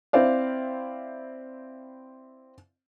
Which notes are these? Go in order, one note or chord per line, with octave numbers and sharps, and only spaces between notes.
C4 E4 C5 D5 F5